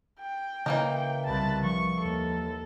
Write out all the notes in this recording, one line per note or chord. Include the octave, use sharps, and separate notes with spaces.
G5
C#3 E3 A#3 D#4 C#5
C2 B4 A5
F3 C#6
D#2 A4